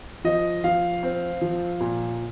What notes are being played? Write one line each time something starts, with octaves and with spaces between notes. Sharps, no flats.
F3 D#5
F3 F5
C4
F3
A#2